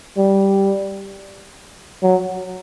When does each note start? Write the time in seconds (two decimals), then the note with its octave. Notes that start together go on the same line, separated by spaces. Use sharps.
0.17 G3
2.03 F#3